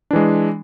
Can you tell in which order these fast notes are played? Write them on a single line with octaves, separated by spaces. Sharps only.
D4 E3 G#3